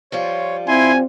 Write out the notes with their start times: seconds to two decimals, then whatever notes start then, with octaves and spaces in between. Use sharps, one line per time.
0.12 F3 G3 F4 C#5
0.68 C4 E4 G#5 C6